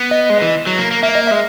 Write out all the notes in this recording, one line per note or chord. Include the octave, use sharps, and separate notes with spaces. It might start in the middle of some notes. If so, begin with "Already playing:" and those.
Already playing: B3
D#5
G#3
E3
F#3
A#3
A#3
A#3 E5
D#5
E5
G#3